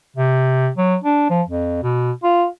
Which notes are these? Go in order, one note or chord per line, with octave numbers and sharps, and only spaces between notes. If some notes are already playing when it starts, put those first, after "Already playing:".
C3
F#3
D4
F3
F2
B2
F4